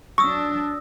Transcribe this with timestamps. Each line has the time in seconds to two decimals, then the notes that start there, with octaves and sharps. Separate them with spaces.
0.18 F#3 D4 C#6 D#6 E6 A#6